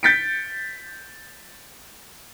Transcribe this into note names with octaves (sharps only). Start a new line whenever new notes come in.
G6 A6 B6 C#7 D7